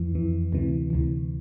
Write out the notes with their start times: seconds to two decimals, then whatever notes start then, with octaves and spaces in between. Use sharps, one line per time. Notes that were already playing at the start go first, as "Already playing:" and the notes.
Already playing: F2 E3
0.15 F2 E3
0.53 D2 C3 E3
0.90 D2 C3 E3